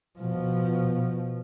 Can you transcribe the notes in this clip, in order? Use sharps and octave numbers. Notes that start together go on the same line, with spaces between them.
B2 F3